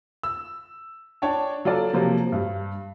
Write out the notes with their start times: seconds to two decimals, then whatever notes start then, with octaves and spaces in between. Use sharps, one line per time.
0.23 E6
1.22 D4 C#5 G5 A5
1.65 F#3 F4 A4 D5
1.93 C3 F3 F#3 A#3
2.32 G2